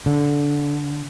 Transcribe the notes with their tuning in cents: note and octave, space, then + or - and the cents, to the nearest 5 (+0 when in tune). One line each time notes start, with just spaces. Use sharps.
D3 -15